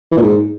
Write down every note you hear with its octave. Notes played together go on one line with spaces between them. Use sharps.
E3
A#2
G#2